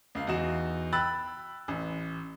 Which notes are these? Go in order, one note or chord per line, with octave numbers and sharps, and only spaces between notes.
C#2 F5
E2 D#4 F#4 E7
G5 B5 E6 F#6 A6
A1